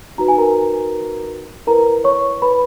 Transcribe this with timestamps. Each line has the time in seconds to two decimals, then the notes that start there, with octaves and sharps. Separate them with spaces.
0.18 D#4 F#4 B4 A#5
0.28 G#5
0.38 A#4 A#5
1.67 E4 A#4 B4 A#5
2.04 C#5 C#6
2.42 B4 B5